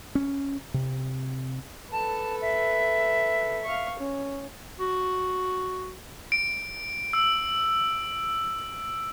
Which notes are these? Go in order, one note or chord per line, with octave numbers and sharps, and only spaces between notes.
C#4
C3
A4 B4 A5
E5
F5 C#6
C#4
F#4
D7
E6